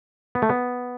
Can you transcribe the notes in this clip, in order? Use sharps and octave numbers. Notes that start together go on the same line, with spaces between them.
B3
A3
B3